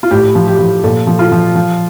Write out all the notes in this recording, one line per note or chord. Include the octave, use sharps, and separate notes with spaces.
F4
A2 G4
F3
G4
F3
A#2 A4
F3
F4
F3
F3